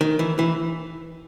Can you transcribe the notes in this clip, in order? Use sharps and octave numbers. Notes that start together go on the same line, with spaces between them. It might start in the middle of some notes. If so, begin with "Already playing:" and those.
D#3
E3
E3